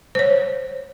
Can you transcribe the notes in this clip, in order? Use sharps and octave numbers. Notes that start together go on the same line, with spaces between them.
C5 C#5